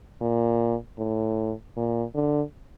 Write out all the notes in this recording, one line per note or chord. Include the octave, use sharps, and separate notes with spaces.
A#2
A2
A#2
D3